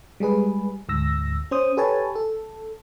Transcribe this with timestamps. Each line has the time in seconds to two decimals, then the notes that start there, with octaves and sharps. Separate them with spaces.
0.20 G3 G#3 G#4 B4
0.89 D2 G#2 E6 A#6
1.51 C#4 C5 D#6
1.77 G4 A4 B4 C#5 G#5 A5
2.16 A4